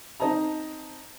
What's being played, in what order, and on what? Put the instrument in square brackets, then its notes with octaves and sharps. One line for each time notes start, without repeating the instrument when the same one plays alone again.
[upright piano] C4 D#4 C5 D#5 A5 A#5